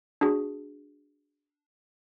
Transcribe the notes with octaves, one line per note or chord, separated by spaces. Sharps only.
D4 F#4 G#4